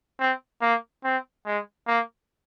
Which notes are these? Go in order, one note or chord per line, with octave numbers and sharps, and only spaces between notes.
C4
A#3
C4
G#3
A#3